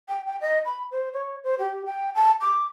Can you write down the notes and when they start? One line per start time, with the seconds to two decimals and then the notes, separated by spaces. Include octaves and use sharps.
0.09 G5
0.26 G5
0.41 D#5
0.65 B5
0.91 C5
1.13 C#5
1.44 C5
1.59 G4
1.86 G5
2.15 A5
2.41 D6